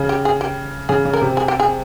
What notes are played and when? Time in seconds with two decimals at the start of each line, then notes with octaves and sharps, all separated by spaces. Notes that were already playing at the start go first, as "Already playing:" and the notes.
Already playing: C#3
0.09 G4
0.25 G#4
0.41 G4
0.89 C#3 G#4
1.05 C#3
1.13 A#4
1.21 C3
1.37 G#4
1.48 G4
1.60 G#4